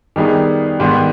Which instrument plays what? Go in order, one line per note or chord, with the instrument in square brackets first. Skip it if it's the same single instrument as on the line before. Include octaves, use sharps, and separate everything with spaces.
[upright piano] D#3 G3 B3 D#4 G#4
G#2 D#3 G3 B3